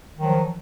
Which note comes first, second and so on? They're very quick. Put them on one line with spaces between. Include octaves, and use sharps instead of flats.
D#3 F#3 F3